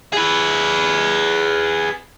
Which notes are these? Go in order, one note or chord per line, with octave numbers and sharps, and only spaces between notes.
G#4 B4